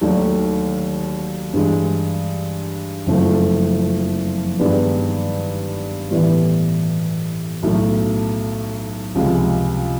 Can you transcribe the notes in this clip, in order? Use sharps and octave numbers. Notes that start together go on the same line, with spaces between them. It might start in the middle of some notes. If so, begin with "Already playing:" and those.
D#2 D#3 F#3 A3 D4
G2 E3 G#3
F#1 F2 C#3 F3 A3
G2 D#3 G#3 B3 D4
A2 E3 G3 B3
B1 A2 F#3 A3
C#2 C3 F3 G#3